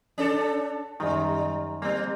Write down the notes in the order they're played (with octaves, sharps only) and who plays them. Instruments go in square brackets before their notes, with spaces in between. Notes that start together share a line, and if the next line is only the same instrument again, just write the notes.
[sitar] C#4 D4 A4
[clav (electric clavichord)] F#2 D#3 [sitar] G3
[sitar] G3 [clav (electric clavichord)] A#3 C4